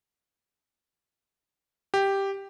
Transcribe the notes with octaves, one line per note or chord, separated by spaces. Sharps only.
G4